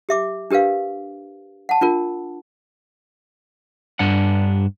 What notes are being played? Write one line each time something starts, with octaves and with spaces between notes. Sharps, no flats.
G4 E5 D6
D4 G4 A#4 B4 F5
F#5 A5
D4 F4 A#4
G2 D4 F#5